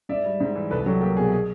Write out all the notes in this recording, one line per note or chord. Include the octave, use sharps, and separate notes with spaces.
G#2 D5 E5
G3
G#2
E3
C2 A4 B4
F#3 G4 A4
A#3 G4
B2 G#4
G#4